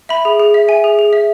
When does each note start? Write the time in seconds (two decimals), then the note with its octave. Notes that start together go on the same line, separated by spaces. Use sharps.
0.09 E5 B5
0.25 G#4
0.40 G#4
0.54 E5
0.68 E5 G#5
0.84 G#4
0.99 G#4
1.13 E5